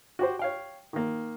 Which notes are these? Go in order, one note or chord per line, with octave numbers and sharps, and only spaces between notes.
F#4 G4 C5
C#5 F5 G5
D#3 A#3